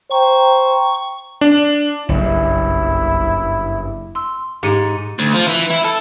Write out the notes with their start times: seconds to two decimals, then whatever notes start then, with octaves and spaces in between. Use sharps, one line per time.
0.10 C5 G5 A#5 C#6
1.41 D4
2.09 F#1 B1 G2 E4
4.15 C6 E6
4.63 G#2 G4 C#7 D#7
5.19 D2
5.34 F3
5.48 E3
5.70 E4
5.85 A4